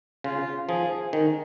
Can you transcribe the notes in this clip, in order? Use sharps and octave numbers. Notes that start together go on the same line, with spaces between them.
C#3 F4
F3 G#4
D#3